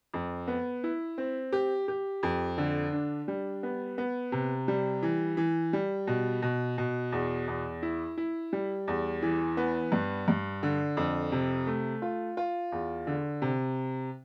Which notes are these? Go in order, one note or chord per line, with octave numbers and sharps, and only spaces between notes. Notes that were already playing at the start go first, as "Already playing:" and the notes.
F2
B3
E4
C4
G4
G4
F2
D3
D4
G3
B3
B3
C3
G3
E3
E3
G3
B2
B2
B2
E2
E2
E4
E4
G3
E2
E3
B3
G2
G2
D3
F2
C3
A3
F4
F4
E2
D3
C3